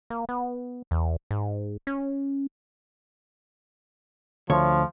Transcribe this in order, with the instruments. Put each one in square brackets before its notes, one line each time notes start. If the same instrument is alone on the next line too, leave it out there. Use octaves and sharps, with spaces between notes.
[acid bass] A#3
B3
E2
G#2
C#4
[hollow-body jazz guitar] D2 C#5 [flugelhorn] F3